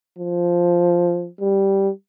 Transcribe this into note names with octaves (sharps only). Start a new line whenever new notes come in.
F3
G3